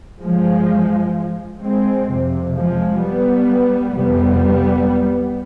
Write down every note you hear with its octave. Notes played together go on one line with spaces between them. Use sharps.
G2 F3 G#3
G#3 C4
F2 C3
F3 G#3
G3 B3
F2 C3 G3 B3